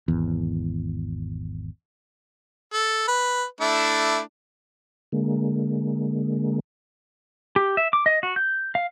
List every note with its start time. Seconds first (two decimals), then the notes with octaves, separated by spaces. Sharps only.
0.08 G#1 E2
2.73 A4
3.08 B4
3.61 A3 D4 E4
5.12 D3 G#3 A#3
7.56 G4
7.77 E5
7.93 D6
8.06 D#5
8.23 F#4
8.36 G6
8.75 F5